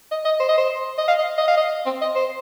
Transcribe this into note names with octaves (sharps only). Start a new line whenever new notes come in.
D#5
D#5
C5
D#5
C5
D#5
F5
D#5
D#5
F5
D#5
C4
D#5
C5